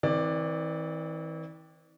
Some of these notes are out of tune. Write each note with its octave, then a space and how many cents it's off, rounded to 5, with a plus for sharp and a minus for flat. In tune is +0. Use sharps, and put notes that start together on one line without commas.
E3 -35 C4 +0 D5 +10